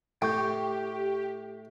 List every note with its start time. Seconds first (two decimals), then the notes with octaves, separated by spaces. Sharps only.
0.22 A2 G4 G5 C#6 G6